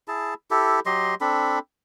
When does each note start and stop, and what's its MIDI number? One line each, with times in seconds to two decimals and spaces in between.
0.08 0.34 64
0.08 0.34 68
0.08 0.34 81
0.51 0.80 64
0.51 0.80 67
0.51 0.80 69
0.86 1.15 54
0.86 1.15 67
0.86 1.15 75
0.86 1.15 84
1.21 1.59 60
1.21 1.59 62
1.21 1.59 69
1.21 1.59 83